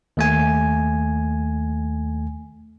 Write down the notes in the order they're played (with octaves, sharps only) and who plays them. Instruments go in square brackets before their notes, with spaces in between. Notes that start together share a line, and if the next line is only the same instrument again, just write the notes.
[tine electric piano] D#2 A3 G#5